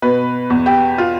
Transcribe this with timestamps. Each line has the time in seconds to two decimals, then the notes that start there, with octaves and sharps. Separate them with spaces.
0.02 B2 B4
0.50 E2
0.66 G4
0.98 F4